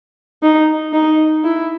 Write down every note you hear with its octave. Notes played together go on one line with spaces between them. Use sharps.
D#4
D#4
E4